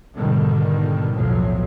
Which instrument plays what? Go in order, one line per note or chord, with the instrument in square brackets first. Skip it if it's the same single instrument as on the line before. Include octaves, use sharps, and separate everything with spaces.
[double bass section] G#2 B2 D3 D#3 G3
B1 E2 A2 C3 F3 F#3